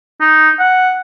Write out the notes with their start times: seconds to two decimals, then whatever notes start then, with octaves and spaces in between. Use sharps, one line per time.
0.21 D#4
0.59 F#5